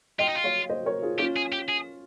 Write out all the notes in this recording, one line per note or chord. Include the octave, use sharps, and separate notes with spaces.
F4 D#5 G5
D#4
F4
C#5 F5
C5 D#5
A#4 C#5
F4 G#4
C#4 F4 G4
G#4
G4
G#4